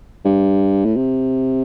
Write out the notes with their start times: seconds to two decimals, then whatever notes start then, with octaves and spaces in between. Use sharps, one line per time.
0.25 G2
0.85 A2
0.96 C3